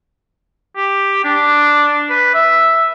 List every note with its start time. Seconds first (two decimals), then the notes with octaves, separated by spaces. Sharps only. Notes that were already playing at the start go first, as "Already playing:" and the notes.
0.76 G4
1.24 D4
2.09 B4
2.34 E5